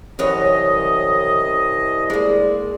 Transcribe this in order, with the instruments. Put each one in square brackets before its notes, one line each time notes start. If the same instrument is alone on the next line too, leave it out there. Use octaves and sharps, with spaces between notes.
[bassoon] C2 [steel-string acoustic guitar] F#2 E3 C#5 [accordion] D#5
[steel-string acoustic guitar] G#3 A#3 [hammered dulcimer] D5